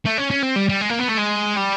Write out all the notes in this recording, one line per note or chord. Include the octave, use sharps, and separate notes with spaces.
A3
C#4
C#4
C4
G3
G3
G#3
A#3
B3
A3
G#3
G3